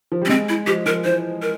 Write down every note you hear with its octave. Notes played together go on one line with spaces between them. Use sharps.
F3
G3
C#4
G#3 C4
E4
F3 G4
F3 A#4
E3 C5
A#4